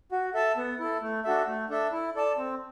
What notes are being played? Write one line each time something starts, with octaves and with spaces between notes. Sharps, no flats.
F#4
A4 E5 A5
B3
E4 A4
A3
D4 F#4 A4 E5
A3
D4 A4 E5
E4
A4 D5 A5
C4